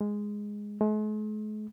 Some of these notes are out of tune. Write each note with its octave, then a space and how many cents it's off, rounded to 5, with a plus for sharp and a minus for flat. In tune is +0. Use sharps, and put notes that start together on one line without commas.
G#3 -5
G#3 +45